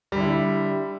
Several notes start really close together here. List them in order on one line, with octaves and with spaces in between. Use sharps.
G3 D3 E4